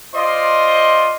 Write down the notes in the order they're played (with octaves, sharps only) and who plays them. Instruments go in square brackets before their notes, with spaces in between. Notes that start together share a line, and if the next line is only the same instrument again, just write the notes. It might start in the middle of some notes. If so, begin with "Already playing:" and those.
[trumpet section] F4 C5 D5 D#5 C6